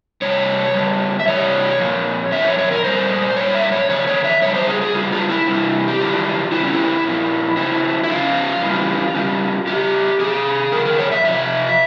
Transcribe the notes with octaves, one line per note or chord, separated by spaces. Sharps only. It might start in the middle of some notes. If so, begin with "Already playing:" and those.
C3 G3 C#5
C#3 G3
E5
C3 E3 G3 C#5
A#2 F3
A#2 F3 E5
C#5
C#5
A#4
A#2 G3 C5
A#2 G3 C#5
E5
C#5
C#3 F3 C#5
C#5
E5
C#3 G3 C#5
C5
G#4
G#4
C#3 G3 F4
F4
E4
C3 E3 G3
G4
C#3 E3 G3 F4
C#3 E3 G3 E4
C#4
E4
A#2 F3
C#3 F3 E4
E4
C#3 F3 F4
C#3 E3 G3
C#3 G3
C#3 E3 G3 G4
C3 F3 G#4
C#3 F3 A#4
A#4
C#5
E5
C3 F3 E5